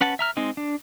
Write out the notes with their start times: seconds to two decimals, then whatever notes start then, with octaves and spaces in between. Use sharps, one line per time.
0.01 C#4 B4 F#5 A5
0.19 E5 A#5 F6
0.37 G#3 C4 D#4
0.57 D4